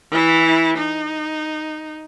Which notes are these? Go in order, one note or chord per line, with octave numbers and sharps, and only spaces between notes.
E3 E4
D#4